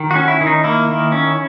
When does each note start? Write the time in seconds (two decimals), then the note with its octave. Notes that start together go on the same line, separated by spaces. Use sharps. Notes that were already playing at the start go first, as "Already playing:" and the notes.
Already playing: D#3
0.11 C#4 F#4
0.28 E4
0.41 D#3
0.47 D#4
0.64 A#3 E4
0.88 D#3
1.12 C#4